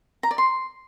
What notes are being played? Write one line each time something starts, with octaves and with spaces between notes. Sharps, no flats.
A#5
D5
C6